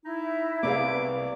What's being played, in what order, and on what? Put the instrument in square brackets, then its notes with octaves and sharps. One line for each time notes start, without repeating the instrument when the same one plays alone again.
[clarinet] D#4 [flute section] E4
[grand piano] C2 C3 G3 [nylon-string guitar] B3 G#4 F5 [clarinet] D6